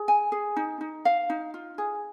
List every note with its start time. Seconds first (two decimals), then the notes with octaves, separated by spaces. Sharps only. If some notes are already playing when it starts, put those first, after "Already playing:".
Already playing: G#4
0.08 G#5
0.32 G#4
0.56 D#4
0.81 D#4
1.05 F5
1.30 D#4
1.54 F4
1.78 G#4